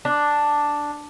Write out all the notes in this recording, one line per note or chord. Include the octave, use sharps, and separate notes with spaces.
D4